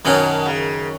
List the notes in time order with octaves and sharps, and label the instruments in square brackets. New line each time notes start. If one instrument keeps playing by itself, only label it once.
[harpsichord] F#2 D#3 F#3 C#4 F#4 [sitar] B2
[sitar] C#3